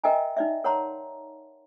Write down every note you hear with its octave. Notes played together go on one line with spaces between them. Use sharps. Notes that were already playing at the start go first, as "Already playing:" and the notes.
A#4 D#5 E5 G5 G#5 A#5
D#4 D5 E5
A#4 C#5 F#5 A5 A#5 C6